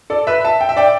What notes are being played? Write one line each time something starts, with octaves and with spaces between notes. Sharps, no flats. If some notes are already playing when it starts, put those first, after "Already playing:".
A4 D5
B4 E5
E5 A5
G5
E5
D5 G5